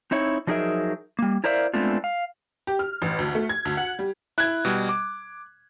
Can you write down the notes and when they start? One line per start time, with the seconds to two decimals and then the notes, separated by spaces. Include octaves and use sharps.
0.11 C4 D#4 E4 C#5
0.47 F3 F#3 D#4 G#4 A#4 E5
1.19 G3 A#3
1.44 E4 A#4 C5 D5 E5 F5
1.74 G#3 A3 B3 C4 D4 F4
2.04 F5
2.67 G4
2.79 F6
3.02 A1
3.19 D2
3.35 A3
3.49 G#6
3.65 D2
3.77 F#5
3.99 G3
4.38 E4 F#6 G#6
4.65 B2 G3
4.89 D6